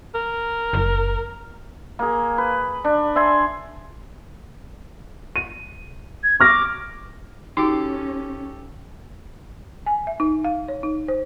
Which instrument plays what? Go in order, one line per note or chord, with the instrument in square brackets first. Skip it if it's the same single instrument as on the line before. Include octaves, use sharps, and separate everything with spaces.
[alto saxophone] A#4
[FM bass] F#1
[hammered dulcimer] A#3 G#4
B4
D4
D5 E5 G#5 C6
[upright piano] D#7
[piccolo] G#6
[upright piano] C#6 F6 A#6 [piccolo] D6
[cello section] C#4 [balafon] D#4 F#4 [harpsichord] G4 A4
[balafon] G#5
E5
D#4
F5
C#5
D#4
C5